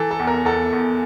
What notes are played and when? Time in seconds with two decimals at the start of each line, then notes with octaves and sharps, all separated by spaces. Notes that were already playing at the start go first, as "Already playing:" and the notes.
Already playing: E3 A4
0.11 A4
0.19 E2
0.27 A#4
0.45 E2 A4
0.72 E2